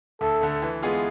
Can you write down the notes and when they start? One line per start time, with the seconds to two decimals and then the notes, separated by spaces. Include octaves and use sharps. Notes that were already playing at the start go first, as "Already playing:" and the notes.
0.21 D2 A4
0.41 D3 A3
0.62 E3
0.83 G#3 B3 F4 G#4